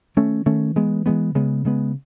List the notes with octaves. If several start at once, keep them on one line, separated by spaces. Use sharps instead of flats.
D#3 A3 C#4
D#3 A3 C#4
E3 G#3 B3
E3 G#3 B3
C#3 G#3 B3
C#3 G#3 B3